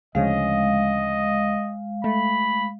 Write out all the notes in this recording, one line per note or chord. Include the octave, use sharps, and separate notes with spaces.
D2 C#3 F3 G#3 D#5 F5
A3 B5